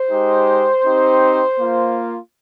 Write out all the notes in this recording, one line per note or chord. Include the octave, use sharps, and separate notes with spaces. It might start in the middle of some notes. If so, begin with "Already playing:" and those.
Already playing: C5
G#3 D#4 G4
C4 D#4 G4
A#3 F4